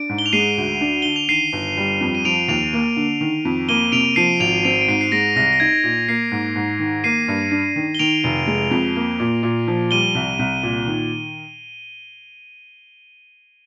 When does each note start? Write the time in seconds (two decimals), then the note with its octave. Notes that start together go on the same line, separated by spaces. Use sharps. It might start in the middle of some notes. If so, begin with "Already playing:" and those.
Already playing: D4 D7
0.09 G#2
0.18 G7
0.26 F7
0.33 G#3 C7 D#7
0.57 D2
0.81 D4
1.02 D3 G7
1.16 F7
1.28 D#3 C7 D#7
1.53 G1
1.77 G3
2.01 F2
2.15 D#7
2.25 F3 D7 F7
2.48 D#2 D7 F7
2.73 A#3
2.96 D3
3.21 D#3
3.45 F2
3.68 A#3 D#7 G7
3.92 C3 D7 F7
4.16 F3 C7 D#7
4.40 G#1 D7 F7
4.65 C4 D7 F7
4.81 D7
4.88 G#2 C7 D#7
5.01 C7
5.12 G#3 A#6 D7
5.36 C2 A#6
5.53 A#6
5.60 D#4 G#6
5.84 A#2
6.08 A#3 C7
6.32 G#2
6.56 G#2
6.79 D#3
7.04 A#3 C7 D#7
7.28 G2
7.51 D4
7.76 D#3
7.95 G7
7.99 D#3 D7 F7
8.24 F1
8.47 G#3
8.71 F2
8.96 A#3
9.20 A#2
9.43 A#2
9.68 F3
9.91 G3 D#7 G7
10.15 C2
10.39 C2
10.63 A#2
10.87 D#3